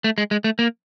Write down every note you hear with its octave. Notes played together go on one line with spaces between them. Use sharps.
A3
G#3
G#3
A3
A#3